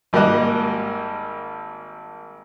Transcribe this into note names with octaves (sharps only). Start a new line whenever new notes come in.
G#1 G3 A#3 G4 D#5 F#6